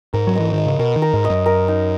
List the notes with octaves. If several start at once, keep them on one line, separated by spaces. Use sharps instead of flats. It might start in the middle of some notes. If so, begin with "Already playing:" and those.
G#2 A#4
F#3
E3 D#5
D#3 D#5
C#3
B2 A#4
D#3
A#4
G#2
D#5
F#2
A#4
D#4